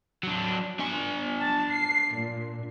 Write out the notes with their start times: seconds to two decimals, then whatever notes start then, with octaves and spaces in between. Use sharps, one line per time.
0.23 F#3 D4
0.80 D4 G#5
1.40 A5
1.71 C7
2.15 A#2